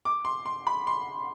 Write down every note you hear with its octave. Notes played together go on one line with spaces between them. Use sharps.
D6
C6
C6
B5
C6